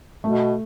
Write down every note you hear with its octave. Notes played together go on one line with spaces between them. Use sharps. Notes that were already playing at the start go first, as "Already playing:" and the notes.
B2 A3